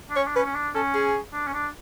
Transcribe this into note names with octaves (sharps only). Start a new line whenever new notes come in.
D4
C#4 C#5
D4
C#4 B4
C#4
D4
C#4 A4
G#4
D4
C#4
D4